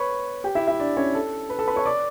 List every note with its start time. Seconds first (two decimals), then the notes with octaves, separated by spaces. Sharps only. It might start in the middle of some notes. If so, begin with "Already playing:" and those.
Already playing: B4 C#5 B5 C#6
0.44 G4 G5
0.55 E4 E5
0.67 E4 E5
0.79 D4 D5
0.97 C#4 C#5
1.15 A4
1.50 B4
1.59 A4 A5
1.67 B4 B5
1.76 C#5 C#6
1.86 D5 D6